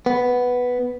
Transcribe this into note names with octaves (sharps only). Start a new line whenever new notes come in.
B3